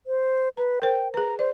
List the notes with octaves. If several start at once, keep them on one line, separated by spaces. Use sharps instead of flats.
C5
B4 A#5
A#4 C5 G5
G#4 B4 A#5
C5 D5